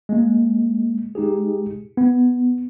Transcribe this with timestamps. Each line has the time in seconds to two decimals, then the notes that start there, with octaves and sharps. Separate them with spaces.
0.09 G#3 A#3
1.15 G#3 D#4 G4 G#4
1.97 B3